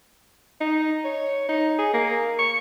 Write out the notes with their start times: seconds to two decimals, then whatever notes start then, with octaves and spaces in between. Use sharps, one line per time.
0.61 D#4
1.05 C#5
1.49 D#4
1.79 G#4
1.93 A#3
2.39 C#6